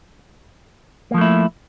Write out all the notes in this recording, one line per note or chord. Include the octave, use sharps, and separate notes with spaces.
F3 A3 A#3 E4